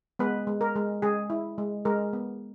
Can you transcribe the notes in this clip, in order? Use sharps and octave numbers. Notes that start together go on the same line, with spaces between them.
G#3 B3 B4
G#3
A#4
G#3
G#3 G#4
E4
G#3
G#3 A#4
B3